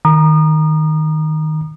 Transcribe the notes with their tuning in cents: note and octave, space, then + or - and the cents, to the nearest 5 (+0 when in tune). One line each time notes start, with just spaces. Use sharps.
D#3 +0 A#5 +15 D#6 -35